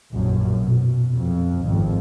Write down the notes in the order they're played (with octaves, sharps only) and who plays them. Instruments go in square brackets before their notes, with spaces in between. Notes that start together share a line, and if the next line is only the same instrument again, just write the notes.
[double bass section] A#1 F#2
B2
F2
G#1 F2